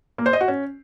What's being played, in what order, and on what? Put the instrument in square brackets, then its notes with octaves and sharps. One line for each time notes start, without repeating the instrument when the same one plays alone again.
[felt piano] A#3
C5
D#5
F#4
C#4